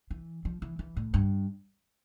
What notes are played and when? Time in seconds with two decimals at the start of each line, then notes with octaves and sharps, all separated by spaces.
0.10 E3
0.45 F3
0.62 E3
0.79 E3
0.96 A2
1.14 G2